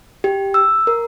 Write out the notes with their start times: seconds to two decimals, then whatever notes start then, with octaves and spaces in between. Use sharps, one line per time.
0.24 G4
0.54 E6
0.87 A#4